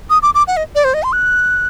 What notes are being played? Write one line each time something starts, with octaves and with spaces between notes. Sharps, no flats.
D#6
D6
D6
F#5
D#5
D5
C5
D#5
C6
F#6